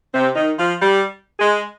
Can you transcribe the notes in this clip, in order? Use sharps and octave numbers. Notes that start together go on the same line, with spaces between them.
C3 C4
D#3 D#4
F3 F4
G3 G4
G#3 G#4